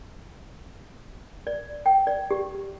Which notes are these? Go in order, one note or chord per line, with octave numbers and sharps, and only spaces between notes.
D5
G5
D5
G4